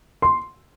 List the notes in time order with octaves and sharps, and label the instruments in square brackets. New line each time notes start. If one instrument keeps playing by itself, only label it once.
[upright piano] C6